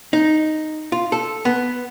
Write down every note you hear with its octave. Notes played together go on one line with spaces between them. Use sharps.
D#4
F4
A4
B3